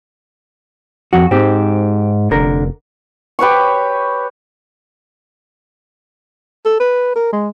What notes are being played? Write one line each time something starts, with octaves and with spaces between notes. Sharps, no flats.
F2 F#4
G#2 C4 G4
F1 D3 A#4
G4 B4 C#5 C#6
A4
B4
A#4
G#3